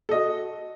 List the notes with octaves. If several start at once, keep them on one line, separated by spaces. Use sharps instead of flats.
F#4 A4 D#5